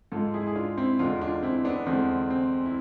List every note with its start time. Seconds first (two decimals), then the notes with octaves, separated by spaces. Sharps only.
0.12 G#2 G#3 F4 A4
0.34 E4 G#4
0.47 G#4
0.56 D4 F4
0.78 C4 E4
0.99 E2 D3 G#3 D4 F4
1.21 D4 F4
1.42 C4 E4
1.65 B3 D4
1.86 E2 D3 G#3 C4
2.30 C4
2.66 E4